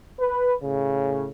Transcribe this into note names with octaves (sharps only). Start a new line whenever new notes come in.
B4
A2 C#3